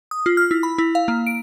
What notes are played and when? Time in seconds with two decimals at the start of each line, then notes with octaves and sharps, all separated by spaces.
0.11 D#6
0.26 F4
0.37 F6
0.51 E4
0.63 B5
0.78 E4
0.95 F5
1.08 A#3
1.27 D7